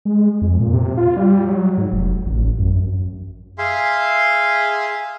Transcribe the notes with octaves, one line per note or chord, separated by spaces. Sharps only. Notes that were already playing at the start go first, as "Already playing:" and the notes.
G#3
F2
A#2
C3
F4
G3
F#3
G#2
F1
A1
F#2
G#4 E5 F5 C6